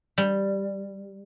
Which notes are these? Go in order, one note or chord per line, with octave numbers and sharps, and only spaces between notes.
G3